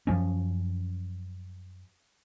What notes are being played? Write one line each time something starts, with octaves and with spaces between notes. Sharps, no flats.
F#2 F3 C#4